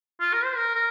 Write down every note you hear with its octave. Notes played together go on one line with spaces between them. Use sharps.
F4
A#4
C5
A#4
A#4